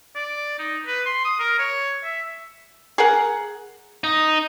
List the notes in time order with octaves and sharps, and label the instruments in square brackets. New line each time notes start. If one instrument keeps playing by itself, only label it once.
[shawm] D5
D#4
B4
C6
D#6
A#4
C#5
E5
[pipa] G#4 A#4 F#5
[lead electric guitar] D#4